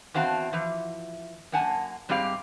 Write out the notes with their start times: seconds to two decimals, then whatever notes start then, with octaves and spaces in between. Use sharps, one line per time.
0.14 E2 C4 F#4 F5 A5
0.53 E3 F3
1.52 F#2 A#3 F#5 G#5 A5
2.09 G#2 G3 C4 G4 G#4 F5